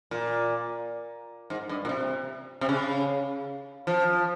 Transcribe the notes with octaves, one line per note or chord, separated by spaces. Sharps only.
A#2
G#2
G2
A#2
C3
C3
C#3
F3